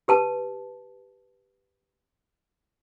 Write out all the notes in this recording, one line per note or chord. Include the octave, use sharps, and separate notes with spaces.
G4 B4 A5